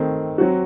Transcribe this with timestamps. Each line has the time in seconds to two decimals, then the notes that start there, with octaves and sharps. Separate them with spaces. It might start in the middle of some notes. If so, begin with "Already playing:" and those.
Already playing: D#3 A3 C4
0.38 F#3 C4 F#4